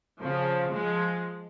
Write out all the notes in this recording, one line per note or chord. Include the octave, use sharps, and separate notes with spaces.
C#3 F3
F3 G#3